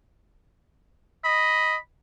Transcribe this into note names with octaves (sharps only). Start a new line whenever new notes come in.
D#5 B5